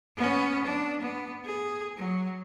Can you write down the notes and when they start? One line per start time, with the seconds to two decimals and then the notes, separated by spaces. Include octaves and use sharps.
0.17 B3 C#4
0.64 D4
1.01 B3
1.45 G#4
1.97 F#3